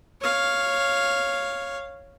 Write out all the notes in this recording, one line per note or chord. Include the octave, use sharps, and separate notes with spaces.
C#5 F5